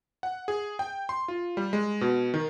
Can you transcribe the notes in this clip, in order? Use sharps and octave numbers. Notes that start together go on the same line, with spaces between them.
F#5
G#4
G5
C6
F4
G3
G#3
B2
D#3